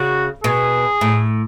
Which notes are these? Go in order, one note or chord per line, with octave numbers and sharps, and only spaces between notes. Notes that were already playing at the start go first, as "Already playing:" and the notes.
Already playing: C#3 F#4
B2 G#4
A2